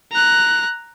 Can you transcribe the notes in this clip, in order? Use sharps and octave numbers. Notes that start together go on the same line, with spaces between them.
A#5 F#6